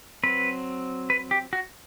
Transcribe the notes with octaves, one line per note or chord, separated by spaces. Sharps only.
F#3 C4 B4
B4
G4
F#4